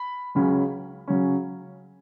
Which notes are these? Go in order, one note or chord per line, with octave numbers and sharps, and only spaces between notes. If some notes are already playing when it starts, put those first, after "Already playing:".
Already playing: B5
C#2 C#3 F#3 C#4
C#3 F#3 C#4